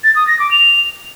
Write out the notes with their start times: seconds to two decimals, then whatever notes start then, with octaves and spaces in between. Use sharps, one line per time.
0.04 A6
0.16 D#6
0.27 A#6
0.39 D6
0.51 F7